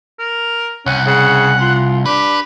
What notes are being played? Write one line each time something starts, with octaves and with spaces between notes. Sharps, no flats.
A#4
C2 C#4 F#5
C#3 F#5
F4
D4 G4 B4